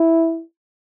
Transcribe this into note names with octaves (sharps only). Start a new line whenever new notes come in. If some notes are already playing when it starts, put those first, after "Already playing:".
Already playing: E4